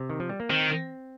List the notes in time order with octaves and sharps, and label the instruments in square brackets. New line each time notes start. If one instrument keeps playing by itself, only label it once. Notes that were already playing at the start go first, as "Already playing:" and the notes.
Already playing: [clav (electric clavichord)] C3
D#3
F3
G3
A#3
[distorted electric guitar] D#3 [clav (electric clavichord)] C4